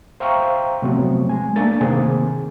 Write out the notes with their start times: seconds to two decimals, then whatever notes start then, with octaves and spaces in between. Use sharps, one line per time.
0.20 C5 E5 F5 G5 A#5 C#6
0.82 C3 F3 F#3 A3 B3 C4
1.29 G#3 G#5
1.56 A3 A#3 D4 A6
1.81 C3 D#3 A#3 C4 G#4